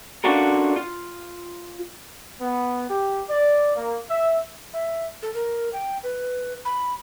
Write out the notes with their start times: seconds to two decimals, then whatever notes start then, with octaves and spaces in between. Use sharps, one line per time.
0.24 C#4 D4 F4 F#4 A4 A#4
0.76 F4
2.40 B3
2.90 G4
3.30 D5
3.76 A#3
4.09 E5
4.74 E5
5.23 A4
5.34 A#4
5.73 G5
6.03 B4
6.65 B5